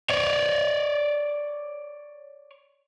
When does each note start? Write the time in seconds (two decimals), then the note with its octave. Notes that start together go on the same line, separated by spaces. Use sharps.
0.10 C#5 D5